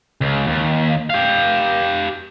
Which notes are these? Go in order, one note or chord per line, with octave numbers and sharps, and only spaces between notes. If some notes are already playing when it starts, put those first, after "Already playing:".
C#2
D#2
G4 F5